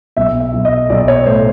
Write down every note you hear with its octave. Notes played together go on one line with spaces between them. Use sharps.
B1 E5
E5
B1
D#5
B1 D5
C#5
A2 C5